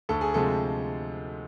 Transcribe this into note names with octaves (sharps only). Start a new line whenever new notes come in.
D2 A4
G#4
C3 F3 G#3 A4